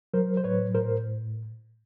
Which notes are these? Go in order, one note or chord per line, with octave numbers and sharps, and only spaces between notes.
F#3 A#4 C5
C5
A2 B4 C#5
A2 A#4 C5